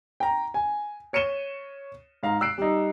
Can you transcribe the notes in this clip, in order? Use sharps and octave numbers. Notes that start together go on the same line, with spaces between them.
G5 A#5
G#5
C#5 C#7 D#7 E7 G7
G#2 F5 A#5
E6 F#6 C7 D7
G3 D#4